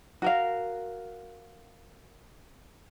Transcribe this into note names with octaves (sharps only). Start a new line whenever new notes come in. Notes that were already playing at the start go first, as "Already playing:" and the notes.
F#4 A#4 F5